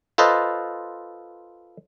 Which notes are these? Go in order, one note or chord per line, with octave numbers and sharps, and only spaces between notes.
F4 A4 B4 C5 D#5